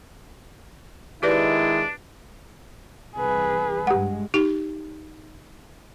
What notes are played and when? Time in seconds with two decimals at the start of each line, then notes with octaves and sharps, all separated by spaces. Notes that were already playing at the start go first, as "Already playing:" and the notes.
1.23 D#3 G#3 D4 E4 G4 B4 D5
3.16 C2 E3 G#4 B4
3.87 G2 G#3 G4 F#5
4.34 D#4 G4